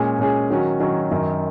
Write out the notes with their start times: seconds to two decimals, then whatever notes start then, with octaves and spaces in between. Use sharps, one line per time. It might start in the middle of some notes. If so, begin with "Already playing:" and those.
Already playing: A#2 G#3 C#4 G#4
0.19 A#2 G#3 C#4 G#4
0.50 D#3 F#3 C#4 F#4
0.80 D#3 F#3 C#4 F#4
1.11 F#2 D#3 F#3